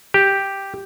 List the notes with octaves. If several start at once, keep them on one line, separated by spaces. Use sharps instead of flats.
G4